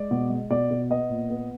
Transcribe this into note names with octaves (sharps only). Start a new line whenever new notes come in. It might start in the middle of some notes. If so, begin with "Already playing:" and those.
Already playing: G#3 D5
B2
G#3
B2 D5
B2
B3 D#5
A#2
B3